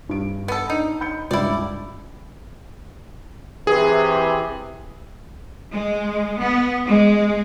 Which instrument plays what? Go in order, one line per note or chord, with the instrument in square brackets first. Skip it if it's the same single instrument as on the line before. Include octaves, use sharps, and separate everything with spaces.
[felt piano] G2 D7
[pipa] B3 A4
[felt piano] D4 [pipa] D#4
[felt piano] B5 G6 C#7
[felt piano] C#2 G2 [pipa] E4 D5
[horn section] C3 E3 [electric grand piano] G#4
[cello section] G#3
B3
G#3